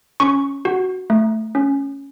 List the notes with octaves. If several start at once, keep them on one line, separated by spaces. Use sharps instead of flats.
C#4 C#6
F#4
A3
C#4